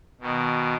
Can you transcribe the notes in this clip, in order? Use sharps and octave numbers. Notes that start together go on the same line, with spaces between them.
B2 D#3